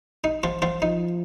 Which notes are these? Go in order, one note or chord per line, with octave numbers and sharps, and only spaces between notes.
D#4
F3 F4
F3 F4
F3 D#4